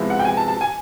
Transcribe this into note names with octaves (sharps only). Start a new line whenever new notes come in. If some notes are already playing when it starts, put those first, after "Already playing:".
Already playing: C3 F3 G#3 B3 E4
F#5
G5
G#5
A5
A5
G#5